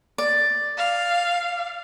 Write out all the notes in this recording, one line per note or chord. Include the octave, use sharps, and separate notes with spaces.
D5
F5